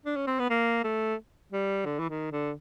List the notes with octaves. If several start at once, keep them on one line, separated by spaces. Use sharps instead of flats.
D4
C#4
C4
B3
A#3
A3
G3
D3
E3
D#3
D3